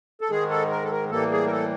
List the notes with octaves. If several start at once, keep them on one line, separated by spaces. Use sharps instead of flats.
A4
G#2 D#3 G#3 G#4
A4
A#4
A4
A#4
A2 E3 G3 A#3 A4
G#4
A#4
A4